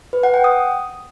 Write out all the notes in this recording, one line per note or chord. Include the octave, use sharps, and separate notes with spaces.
B4
F#5
G5
D#6